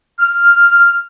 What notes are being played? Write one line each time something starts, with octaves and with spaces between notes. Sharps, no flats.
F6